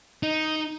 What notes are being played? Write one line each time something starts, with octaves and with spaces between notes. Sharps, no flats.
D#4